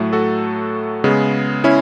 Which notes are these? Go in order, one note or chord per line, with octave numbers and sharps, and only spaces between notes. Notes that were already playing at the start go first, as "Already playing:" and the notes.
Already playing: A2 F#3 A3
F#4 A4
C#3 G#3 B3
C#4 E4